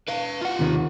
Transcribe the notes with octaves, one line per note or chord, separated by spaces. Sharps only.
B4 F5
F4 F#5
D#2 C3 D#3